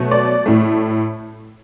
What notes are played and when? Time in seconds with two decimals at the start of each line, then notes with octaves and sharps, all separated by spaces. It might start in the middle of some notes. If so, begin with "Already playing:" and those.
Already playing: B2 F#3 A3
0.11 D5
0.46 A2 A3